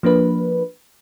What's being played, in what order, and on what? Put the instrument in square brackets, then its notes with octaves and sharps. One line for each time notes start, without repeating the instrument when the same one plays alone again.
[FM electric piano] F3 A#3 D4 B4